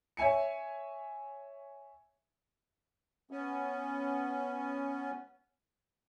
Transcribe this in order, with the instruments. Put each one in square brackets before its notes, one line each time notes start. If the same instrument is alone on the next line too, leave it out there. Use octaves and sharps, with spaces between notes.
[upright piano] C#5 E5 G#5 C#7
[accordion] B3 C#4